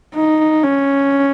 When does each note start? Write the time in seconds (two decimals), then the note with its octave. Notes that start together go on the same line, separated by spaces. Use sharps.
0.15 D#4
0.63 C#4